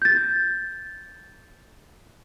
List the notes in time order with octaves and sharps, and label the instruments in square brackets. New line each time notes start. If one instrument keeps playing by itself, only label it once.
[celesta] G6 A6